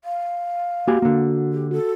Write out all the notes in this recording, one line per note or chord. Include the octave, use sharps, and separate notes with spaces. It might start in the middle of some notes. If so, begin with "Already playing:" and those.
F5
A#3 F#4 G4 G#5
D3 A#3
G4
F#4 A4